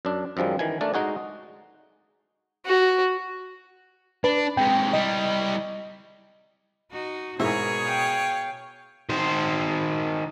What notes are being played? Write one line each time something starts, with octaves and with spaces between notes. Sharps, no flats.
F#2 D4
F#2 D#3 F3 G3 G#3
D#3 E3 G#5
A3 D4 A#4 D5
G#3 D#4 F#4 G#4
F#4
D4 B4
C3 G#3 G5
G3 E4 D#5
D#4 F#4
G#2 B2 E4 G#4 A#4 C#5
F5 G5
D#3 C5